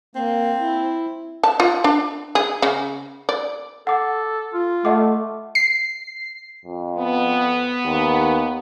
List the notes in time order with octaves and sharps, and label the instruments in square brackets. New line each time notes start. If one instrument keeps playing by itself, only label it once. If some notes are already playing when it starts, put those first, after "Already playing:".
[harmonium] A#3 [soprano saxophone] C4
[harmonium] E4
[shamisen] A5
F4
D4
G#4
C#3
D5
[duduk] A4 [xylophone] F#5 D6
[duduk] F4
[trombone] A3 [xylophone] D#5 F#5 D6
[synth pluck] C7
[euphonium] F2
[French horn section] B3
[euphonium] D#2